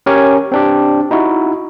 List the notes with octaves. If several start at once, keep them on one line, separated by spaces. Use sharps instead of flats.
C#4 G4 A#4 C#5 G#5
C4 D4 G4
D#4 E4 F#4